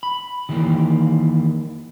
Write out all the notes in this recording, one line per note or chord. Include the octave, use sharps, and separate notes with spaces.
B5
D#3 E3 G3 A3 A#3